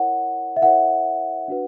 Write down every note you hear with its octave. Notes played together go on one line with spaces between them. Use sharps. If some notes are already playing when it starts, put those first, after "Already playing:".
Already playing: E4 A#4 C#5 F#5
E5
E4 A#4 C#5 F#5
D4 F#4 B4